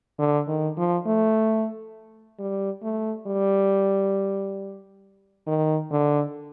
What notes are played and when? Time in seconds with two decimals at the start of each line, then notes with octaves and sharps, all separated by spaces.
0.19 D3
0.48 D#3
0.77 F3
1.06 A3
2.39 G3
2.82 A3
3.27 G3
5.47 D#3
5.91 D3